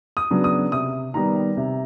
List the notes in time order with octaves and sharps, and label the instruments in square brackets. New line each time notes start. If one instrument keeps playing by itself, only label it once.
[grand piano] D#6
C#3 F#3 B3 D4
D#6
C3 D#6
D#3 G3 B3 A#5
C3